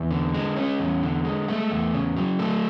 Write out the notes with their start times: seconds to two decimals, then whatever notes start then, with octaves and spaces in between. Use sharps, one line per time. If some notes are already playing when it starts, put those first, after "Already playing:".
Already playing: E2
0.11 D3
0.34 G#3
0.56 C#4
0.79 E2
1.03 D3
1.25 G#3
1.48 A3
1.71 E2
1.94 C#3
2.17 F#3
2.39 A3